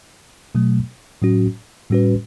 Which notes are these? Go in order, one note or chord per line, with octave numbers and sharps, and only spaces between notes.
B2 F#3 A3
A2 F#3 C#4 F#4
A2 G3 C#4 F#4 B4